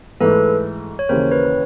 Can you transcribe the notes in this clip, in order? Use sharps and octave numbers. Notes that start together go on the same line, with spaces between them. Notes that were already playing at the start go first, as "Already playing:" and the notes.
G#2 E3 A3 A4 B4
C#5
D#2 C#3 E3 A#4 C5
B4 C#5